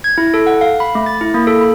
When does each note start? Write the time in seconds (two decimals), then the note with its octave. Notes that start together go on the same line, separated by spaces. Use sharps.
0.04 G#6
0.18 E4
0.34 A4
0.47 F#5
0.61 F5
0.80 B5
0.95 A3
1.06 A6
1.21 E4
1.34 A#3
1.47 A4
1.61 B5